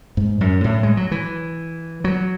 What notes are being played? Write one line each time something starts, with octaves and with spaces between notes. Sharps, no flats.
G#2
F#2
A2
G#3
F#3
E3
F#3